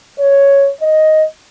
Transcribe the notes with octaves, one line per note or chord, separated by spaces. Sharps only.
C#5
D#5